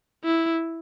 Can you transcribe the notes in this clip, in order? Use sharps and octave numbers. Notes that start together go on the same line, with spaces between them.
E4